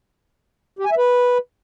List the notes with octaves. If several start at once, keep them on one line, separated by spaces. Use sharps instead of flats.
G4
G#5
E5
B4